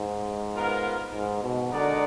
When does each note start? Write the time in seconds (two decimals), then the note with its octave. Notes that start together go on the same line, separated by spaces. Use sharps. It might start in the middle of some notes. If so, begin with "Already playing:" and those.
Already playing: G#2
0.55 B3 F4 A#4
1.14 G#2
1.43 B2
1.72 D3 G#3 D#4 A#4 D5 F#5